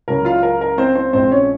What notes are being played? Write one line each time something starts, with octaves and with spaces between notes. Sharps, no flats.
C#2 C#3 F#3 C#4 A#4
F4 F5
A#4
A#4
C4 C5
C4 C5
A#1 A#2 F3 G#3 C4 C5
C#4 C#5